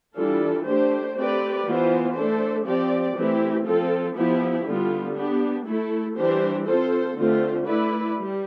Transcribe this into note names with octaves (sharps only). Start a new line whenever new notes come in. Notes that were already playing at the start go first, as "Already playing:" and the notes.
E3 G3 D4 F4 A4
A3 D4 G4 C5
A3 C4 G4 B4 D5
E3 B3 F4 C5
A3 D4 A4 C5
F3 C4 G4 D5
E3 A3 C4 E4 G4
F3 C4 F4 A4
F3 B3 E4 G4
D3 G3 B3 F4
B3 D4 G4
A3 E4 A4
E3 G3 D4 G4 C5
C4 F4 A4 C5
D3 A3 C4 F4 C5
A3 E4 B4 D5
G3